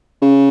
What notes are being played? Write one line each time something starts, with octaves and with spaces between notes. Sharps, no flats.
C#3